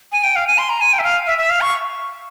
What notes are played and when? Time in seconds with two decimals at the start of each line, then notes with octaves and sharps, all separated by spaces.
0.12 G#5
0.24 G5
0.36 F5
0.47 G#5
0.58 C6
0.70 A#5
0.81 G#5
0.93 G5
0.99 E5
1.04 F5
1.27 E5
1.38 E5
1.50 F5
1.61 C#6